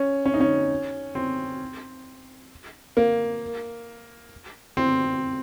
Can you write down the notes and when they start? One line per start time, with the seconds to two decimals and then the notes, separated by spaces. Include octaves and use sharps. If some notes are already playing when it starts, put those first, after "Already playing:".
Already playing: C#4
0.26 C#4
0.34 D#4
0.40 C#4
1.15 C4
2.97 A#3
4.77 C4